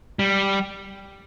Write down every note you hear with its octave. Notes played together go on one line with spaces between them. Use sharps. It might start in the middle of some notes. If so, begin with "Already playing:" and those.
G3